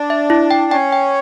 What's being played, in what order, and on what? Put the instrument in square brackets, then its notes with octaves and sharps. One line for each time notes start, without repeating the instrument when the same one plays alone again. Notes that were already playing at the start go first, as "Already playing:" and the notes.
Already playing: [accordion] D4
[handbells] E5
E4
G5
[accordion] C#4 [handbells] G5
[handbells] G5